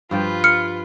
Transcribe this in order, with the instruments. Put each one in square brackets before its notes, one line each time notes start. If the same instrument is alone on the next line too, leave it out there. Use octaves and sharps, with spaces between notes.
[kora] G2 F3 G5 [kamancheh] F4 B4
[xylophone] F6 C#7